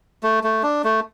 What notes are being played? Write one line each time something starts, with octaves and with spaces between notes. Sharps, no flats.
A3
A3
D4
A3